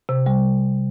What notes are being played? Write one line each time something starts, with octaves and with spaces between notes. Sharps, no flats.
C3
G3